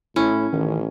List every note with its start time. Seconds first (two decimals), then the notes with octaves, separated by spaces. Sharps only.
0.16 A2 C#4 E4
0.53 A1 D#3